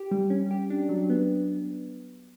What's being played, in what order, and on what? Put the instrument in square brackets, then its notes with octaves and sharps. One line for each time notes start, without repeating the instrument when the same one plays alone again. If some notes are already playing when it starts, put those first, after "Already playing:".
Already playing: [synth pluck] G4
G3
C#4
G4
D4
F#3
B3